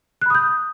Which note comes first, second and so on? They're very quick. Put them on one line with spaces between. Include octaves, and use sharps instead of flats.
F#6 B5 D#6 G6